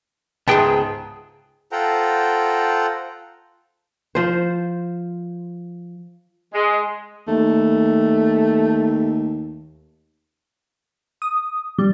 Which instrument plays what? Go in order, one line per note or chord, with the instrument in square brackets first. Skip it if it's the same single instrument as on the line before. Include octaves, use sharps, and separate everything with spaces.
[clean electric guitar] C#2 B3 G5 [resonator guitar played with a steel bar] G#2 G#4 A5
[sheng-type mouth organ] F4 A4 C5 F#5 G5 A#5
[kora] F3 C5
[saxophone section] G#3
[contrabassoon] D#2 [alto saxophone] A3
[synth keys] D#6
G3